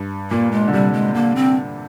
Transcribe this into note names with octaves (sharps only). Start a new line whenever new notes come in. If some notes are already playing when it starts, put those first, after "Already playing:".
Already playing: G2
A#2 A#3
G#3
D3
C3 G3
G#3
D3 A#3
C4